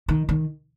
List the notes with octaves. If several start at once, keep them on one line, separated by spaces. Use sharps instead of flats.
D#3
D#3